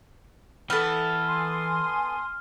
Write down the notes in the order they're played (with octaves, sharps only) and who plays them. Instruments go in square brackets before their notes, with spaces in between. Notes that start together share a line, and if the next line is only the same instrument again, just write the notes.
[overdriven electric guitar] E3 [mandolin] B3 A4 [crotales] F6
[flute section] G#5 C6 D#6